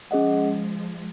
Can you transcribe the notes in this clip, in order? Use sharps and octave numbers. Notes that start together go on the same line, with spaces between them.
F3 G#3 C#4 G#4 D#5 F#5